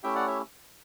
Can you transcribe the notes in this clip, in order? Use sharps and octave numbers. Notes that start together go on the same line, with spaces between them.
A3 C#4 E4 G4 E5 G5
D5 F#5
C#5 E5